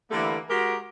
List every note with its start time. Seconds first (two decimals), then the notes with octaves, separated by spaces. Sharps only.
0.11 D3 E3 G3 A3 A#3
0.49 G#3 F#4 G4 A#4